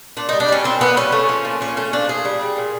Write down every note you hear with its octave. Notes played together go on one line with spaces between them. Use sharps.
A#2 D4
G3 D#4
D4
G3 C#4
A#2 C4
A#2 B3
G3 C#4
A3
F3
A#2
A#2 C#4
A3 C#4
F3 D4
A#2 G#4
G3
G3
A#2